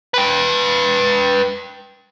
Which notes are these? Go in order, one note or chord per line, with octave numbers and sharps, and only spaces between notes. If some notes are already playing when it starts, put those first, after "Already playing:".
B4 G5